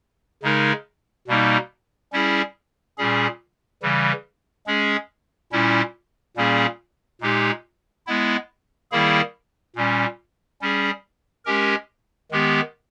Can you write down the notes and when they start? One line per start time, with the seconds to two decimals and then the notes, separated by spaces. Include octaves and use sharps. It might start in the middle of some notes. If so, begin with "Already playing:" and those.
0.43 C#3 G#3 D#4 A#4
1.27 B2 G3 A#3 D#4
2.12 G3 C#4 E4 G#4
2.98 A#2 G3 C#4 G#4
3.82 C#3 E3 G3
4.67 G#3 C#4 G#4
5.52 A#2 G3 C#4 E4
6.37 A#2 G3 A#3 C#4 G#4
7.21 A#2 G#3 D#4 G4
8.06 G#3 B3 E4
8.91 D#3 G3 A#3 E4 G#4
9.76 A#2 G3 C#4
10.61 G3 C#4 G#4
11.45 G#3 C#4 G4 A#4
12.31 D#3 G#3 B3 G4